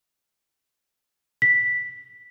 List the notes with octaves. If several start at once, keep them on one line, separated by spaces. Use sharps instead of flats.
B6